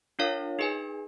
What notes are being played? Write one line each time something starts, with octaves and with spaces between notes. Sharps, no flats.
D4 F4 A#4 C#5 F5
D#4 G#4 B4 D#5 G#5